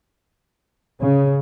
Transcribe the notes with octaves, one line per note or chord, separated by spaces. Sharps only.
C#3